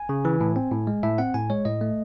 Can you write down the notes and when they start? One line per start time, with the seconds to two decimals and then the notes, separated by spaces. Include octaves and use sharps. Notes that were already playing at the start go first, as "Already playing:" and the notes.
Already playing: G#5
0.09 C#3
0.25 E3
0.41 A2
0.56 C4
0.72 A2
0.87 G#3
1.03 A2 E5
1.18 C4 F#5
1.34 A2 G#5
1.50 G#3 C#5
1.65 A2 D#5
1.81 A3